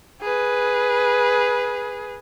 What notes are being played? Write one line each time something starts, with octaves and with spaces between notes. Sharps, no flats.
G#4 B4